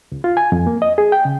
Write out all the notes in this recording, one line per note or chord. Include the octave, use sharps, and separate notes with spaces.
C#2
F4
G#5
F2
A#3
D#5
G#4
G5
C#3